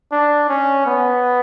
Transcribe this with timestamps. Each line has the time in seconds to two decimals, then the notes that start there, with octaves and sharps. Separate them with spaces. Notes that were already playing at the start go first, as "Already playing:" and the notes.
0.12 D4
0.49 C#4
0.86 B3